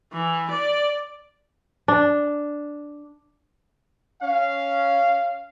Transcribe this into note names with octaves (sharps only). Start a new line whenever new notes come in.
E3
D5
D4
C#4 F5